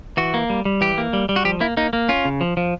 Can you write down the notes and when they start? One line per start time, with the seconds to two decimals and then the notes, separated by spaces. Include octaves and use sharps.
0.17 E3 F#4
0.34 A#3
0.50 G3
0.65 G3
0.81 E3 G4
0.98 A#3
1.13 G3
1.29 G3
1.36 F#4
1.45 F3 G4
1.60 A#3 E4
1.77 A#3 D#4
1.93 A#3
2.09 C#4 F4
2.25 C#3
2.41 F3
2.57 F3